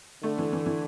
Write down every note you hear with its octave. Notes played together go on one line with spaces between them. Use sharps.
D3 A3
E3
E3
E3